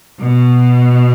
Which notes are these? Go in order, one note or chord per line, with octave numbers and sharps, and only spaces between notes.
B2